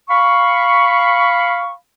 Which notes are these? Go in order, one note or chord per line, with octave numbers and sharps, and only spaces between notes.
F5 B5 C#6